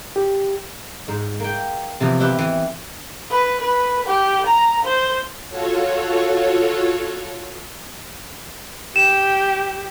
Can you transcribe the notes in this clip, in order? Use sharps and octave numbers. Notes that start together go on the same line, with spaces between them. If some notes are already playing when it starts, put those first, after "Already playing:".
G4
G#2
A#3 G5
C3 E3 F3 B3
E4 G4 B4 E5
E3
B4
B4
G4
A#5
C5
F4 F#4 A4 C#5
G4 E7